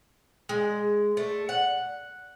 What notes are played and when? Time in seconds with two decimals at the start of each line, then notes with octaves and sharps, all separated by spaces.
0.49 G#3
1.17 A3
1.49 F#5